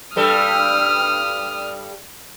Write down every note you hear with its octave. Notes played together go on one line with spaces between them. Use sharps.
G2 G3 A4 D#6 F6